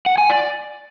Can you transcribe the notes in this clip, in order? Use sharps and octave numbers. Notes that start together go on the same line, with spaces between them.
F#5
G#5
D5